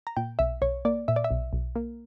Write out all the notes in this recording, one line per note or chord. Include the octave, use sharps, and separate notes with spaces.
A#5
A#2 G5
B1 E5
B1 C#5
A#3 D5
A#2 E5
D5
E5
B1
B1
A#3